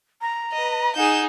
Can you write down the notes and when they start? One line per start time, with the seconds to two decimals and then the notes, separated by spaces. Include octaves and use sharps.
0.21 A#5
0.52 B4 D#5
0.96 D#4 G#4 F#5 G6 E7